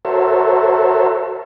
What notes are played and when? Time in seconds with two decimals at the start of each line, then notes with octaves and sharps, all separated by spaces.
0.05 F#4 A4 A#4 C5 C#5 E5